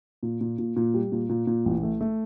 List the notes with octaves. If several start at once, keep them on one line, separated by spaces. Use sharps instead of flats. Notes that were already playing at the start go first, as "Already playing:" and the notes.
A#2
A#2
A#2
A#2
G3
A#2
A#2
A#2
A1
A3
A3